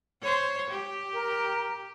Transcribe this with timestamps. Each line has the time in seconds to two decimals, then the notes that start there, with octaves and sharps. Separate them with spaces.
0.22 C5 C#5
0.70 G4
1.13 A#4